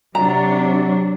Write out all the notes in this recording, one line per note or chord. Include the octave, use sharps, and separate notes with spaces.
C3 F#3 D4 A#5